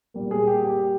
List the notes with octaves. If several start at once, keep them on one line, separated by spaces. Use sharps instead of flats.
A#2 G3 A#3
G#4
G4
G4